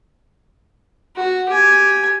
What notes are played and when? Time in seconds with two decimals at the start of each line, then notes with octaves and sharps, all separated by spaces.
1.16 F#4
1.48 G4 G#5